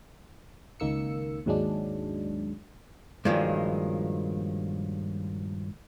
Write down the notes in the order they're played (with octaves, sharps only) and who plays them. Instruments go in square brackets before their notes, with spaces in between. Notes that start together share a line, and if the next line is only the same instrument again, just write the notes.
[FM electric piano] C#2 D#3 A#3 E6 C#7
D#2 G#2 F#3 G#3 D4
[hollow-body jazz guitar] G2 A#2 D#3 F3 F#3 G#3